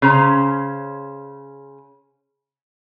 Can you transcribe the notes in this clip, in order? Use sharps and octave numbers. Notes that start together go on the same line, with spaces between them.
C#3 C#4 C5 A#5